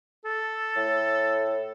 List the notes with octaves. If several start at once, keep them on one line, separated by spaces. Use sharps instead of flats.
A4
A2